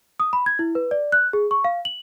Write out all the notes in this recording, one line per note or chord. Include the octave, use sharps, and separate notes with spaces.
D#6
B5
G#6
E4
B4
D5
F#6
G#4
C#6
F5
F#7